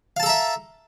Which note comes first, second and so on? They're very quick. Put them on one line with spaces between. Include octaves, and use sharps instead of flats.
F5 A5 A4 A#5 E5